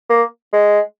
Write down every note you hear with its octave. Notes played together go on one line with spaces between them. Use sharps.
A#3
G#3